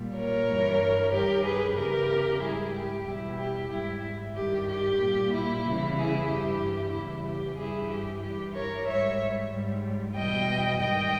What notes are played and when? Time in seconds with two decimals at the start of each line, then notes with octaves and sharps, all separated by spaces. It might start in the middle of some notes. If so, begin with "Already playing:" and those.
Already playing: A#2 G3
0.15 A#4 C#5
0.48 G2 E3 G3
1.12 G2 D#3 G3 G4 A#4
1.45 G#4 B4
1.77 E2 C#3 E3 G4 A#4
2.42 G#2 G3 E4 G#4
2.74 G4
3.06 E2 B2 G3 E4
3.39 G4
3.70 G#2 G3 E4
4.35 G2 D#3 G3 G4
4.68 G4
5.00 A#2 G3
5.33 E4
5.64 E2 C#3 E3 G3
5.97 E4 G#4
6.29 G2 E3 G3 G4
6.93 E2 C#3 E3 G3 E4
7.26 G4
7.58 G2 E3 G3 E4 G#4
7.90 G4
8.23 G2 E3 G3 G4
8.54 A#4 C#5
8.87 G#2 G3 C#5 E5
9.52 G#2 G3
10.16 E2 B2 G3 D#5 G5
10.80 G#2 D#3 G3 D#5 G5